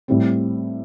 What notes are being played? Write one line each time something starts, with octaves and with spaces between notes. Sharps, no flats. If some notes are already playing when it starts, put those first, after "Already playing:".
A2 G3 C4